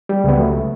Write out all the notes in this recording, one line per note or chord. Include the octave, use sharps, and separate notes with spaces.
G3
C#2 B3
F#3 A3